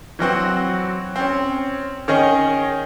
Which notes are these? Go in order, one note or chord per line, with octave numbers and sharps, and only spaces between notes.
E3 F#3 C4 F#4
C4 C#4
D#3 C#4 G#4 D#5